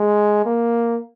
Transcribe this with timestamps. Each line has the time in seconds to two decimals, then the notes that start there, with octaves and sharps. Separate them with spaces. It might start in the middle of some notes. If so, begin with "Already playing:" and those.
Already playing: G#3
0.46 A#3